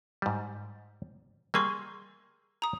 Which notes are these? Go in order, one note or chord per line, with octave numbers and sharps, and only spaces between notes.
G#2 G3
G3 A#3 G#4 C6 C#6 E6
A#5 D#6